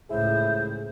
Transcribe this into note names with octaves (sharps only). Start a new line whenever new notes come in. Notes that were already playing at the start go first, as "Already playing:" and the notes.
C#2 A2 E4 G#4 C5